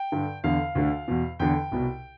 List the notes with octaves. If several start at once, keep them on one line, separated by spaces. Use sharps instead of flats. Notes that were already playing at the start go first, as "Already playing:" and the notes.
Already playing: G5
G2 D3
E2 D3 F5
D2 D3
E2 B2
E2 D3 G5
C2 B2